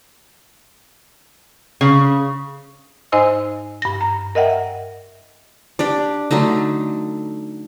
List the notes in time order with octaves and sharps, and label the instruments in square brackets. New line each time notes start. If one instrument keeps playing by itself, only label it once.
[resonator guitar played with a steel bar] C#3
[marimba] G#2 D#4 C5 D#5 G#5 E6
G2 A#6
A#5
A#4 D#5 E5 F#5 G5
[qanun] D4 G4 D5
D3 F#3 A3 D#4